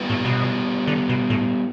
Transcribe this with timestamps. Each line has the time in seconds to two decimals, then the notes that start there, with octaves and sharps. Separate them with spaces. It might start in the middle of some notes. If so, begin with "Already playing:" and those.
Already playing: G3 B3 E4 G4 B4
0.10 A2
0.25 B2
0.87 D3
1.09 B2
1.30 A2